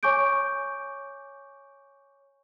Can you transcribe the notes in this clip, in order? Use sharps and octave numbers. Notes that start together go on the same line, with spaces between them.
C#5 G#5 C#6 D6 G6 D7